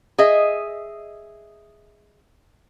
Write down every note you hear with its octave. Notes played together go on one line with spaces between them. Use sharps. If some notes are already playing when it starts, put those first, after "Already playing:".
G#4 D#5 E5